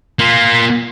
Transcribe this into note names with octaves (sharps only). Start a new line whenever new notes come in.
A#3 F4